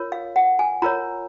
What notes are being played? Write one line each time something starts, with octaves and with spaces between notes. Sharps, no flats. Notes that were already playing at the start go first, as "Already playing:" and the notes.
Already playing: F4 A#4 C#5
F5
F#5
G#5
F4 A#4 C#5 A#5